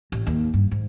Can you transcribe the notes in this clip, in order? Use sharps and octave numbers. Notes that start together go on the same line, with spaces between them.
A1
D#2
G2
G#2